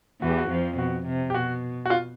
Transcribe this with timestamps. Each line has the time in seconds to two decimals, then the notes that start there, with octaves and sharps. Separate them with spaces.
0.21 E2 E3 F#4
0.30 G4
0.37 F#4
0.50 F2 F3
0.78 B2 F#4
1.06 C3
1.30 G4
1.34 B2 F#4
1.85 F#4
1.90 F4